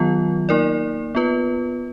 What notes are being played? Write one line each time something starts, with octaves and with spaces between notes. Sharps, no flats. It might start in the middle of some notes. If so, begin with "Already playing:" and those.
Already playing: D#3 F#3 B3 F4
A#3 D#4 A#4 D5
B3 F4 B4